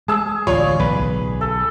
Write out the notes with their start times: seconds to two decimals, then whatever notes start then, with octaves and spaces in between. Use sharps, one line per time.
0.08 G#3 G#4 A5 E6
0.47 A1 D2 D3 F4 C#5 D5
0.80 B1 B4
1.41 A4